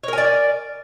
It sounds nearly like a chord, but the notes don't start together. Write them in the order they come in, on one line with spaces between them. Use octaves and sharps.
C#5 A#4 G#5 D5